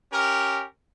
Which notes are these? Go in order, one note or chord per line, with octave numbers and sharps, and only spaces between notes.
C#4 G4 A#4